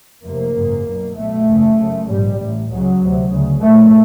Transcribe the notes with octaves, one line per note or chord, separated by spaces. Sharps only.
F1 F2 C3 A#3
G#1 F#2 C#3
B1 B2
B1 B2 A3
F#1 E2 C#3
F#1 F#2 C#3
A#1 G#2 G3
A1 A2
C#2 C#3 F#3
D2 C3
D2 C#3
A#1 A#2 A3